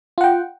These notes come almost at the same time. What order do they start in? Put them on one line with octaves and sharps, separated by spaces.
F4 F#5 G5